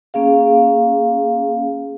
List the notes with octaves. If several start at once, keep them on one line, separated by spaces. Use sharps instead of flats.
A#3 C#4 G#4 F5